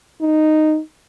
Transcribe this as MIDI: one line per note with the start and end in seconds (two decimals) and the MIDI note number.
0.21 0.80 63